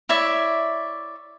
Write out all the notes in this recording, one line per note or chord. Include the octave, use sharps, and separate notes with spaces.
E4 C#5 D5 E5